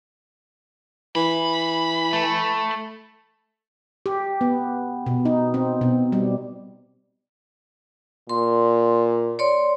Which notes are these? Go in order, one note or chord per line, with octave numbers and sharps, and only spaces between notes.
E3 B5
A3
G4
B3
B2
D#4
C4
B2
G3
A#2 C6
C#5 D5 C6